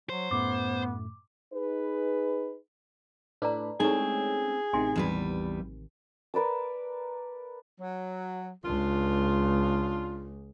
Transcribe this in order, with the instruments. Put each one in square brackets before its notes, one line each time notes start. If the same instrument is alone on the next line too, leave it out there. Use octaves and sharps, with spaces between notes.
[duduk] F#3 [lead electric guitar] C5
[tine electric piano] F#2 A2 A3 [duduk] B3 [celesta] D6
[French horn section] D#4 G#4 B4
[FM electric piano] A2 D4 B5 [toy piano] B4 D5 A#5
[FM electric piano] G#3 A3 C#4 [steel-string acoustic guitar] C4 [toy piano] D#4 E4 [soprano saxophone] G#4
[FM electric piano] A1 C3 D#3 [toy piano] G#5 C6
[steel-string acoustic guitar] E2 G3 B4
[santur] A#4 B4 D5 A5
[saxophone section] F#3
[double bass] C#2 [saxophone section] D4 F4